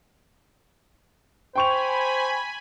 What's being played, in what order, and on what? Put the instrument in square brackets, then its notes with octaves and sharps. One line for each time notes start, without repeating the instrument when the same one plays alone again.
[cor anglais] C5 [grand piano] G5 C#6 F7 [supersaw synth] G#5 B5